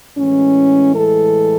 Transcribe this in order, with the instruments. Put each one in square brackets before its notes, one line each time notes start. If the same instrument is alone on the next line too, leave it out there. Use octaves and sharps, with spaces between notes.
[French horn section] A2 E3 G#3 C#4
A4